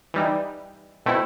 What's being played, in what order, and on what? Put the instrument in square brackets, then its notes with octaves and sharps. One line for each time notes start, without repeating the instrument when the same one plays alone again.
[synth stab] E3 G3 D#4
B2 A3 C4 E4